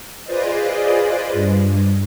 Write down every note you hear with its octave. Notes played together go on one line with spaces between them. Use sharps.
F4 G#4 B4 C5 D5 D#5
G2